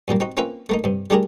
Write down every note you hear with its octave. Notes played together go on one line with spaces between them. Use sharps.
F#2 A#2 G3 A#3
C4 D#4 F#4
A#3 C4 C#4 F4 B4 E5
A3 A#3 D#4
G2 C3
G3 A3 D4 G4 G#4 A#4